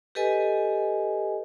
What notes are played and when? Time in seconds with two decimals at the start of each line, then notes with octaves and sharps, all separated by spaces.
0.15 G4 A4 B4 D#5 G#5